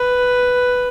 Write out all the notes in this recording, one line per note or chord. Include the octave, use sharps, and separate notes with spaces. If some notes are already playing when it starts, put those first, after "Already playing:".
Already playing: B4